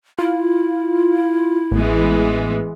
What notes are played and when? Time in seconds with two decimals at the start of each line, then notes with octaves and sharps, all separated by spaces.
0.19 E4 F4
1.72 A1 E3 G#3 B3